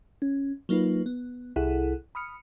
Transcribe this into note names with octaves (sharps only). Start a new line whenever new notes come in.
C#4
F#3 A#3 D#4 F4 B4
B3
C2 E4 G#4 A4 F#5 F#6
B5 D#6 F6 C#7